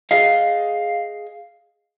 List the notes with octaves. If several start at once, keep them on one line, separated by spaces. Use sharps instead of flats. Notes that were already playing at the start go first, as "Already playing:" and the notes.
G#4 D#5 F5